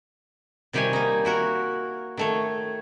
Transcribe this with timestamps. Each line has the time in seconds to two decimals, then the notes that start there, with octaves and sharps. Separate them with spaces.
0.73 C3 D#3 G3 G4 C#5 G#5
0.93 A#3 D#4
1.25 E4 F#4 A#4
2.17 D#3 A3 C#5